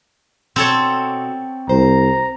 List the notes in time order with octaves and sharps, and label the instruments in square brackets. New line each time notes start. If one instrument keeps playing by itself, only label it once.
[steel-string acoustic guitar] B2 [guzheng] C4 A4 C#5
[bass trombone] C2 [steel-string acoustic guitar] C5 [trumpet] A#5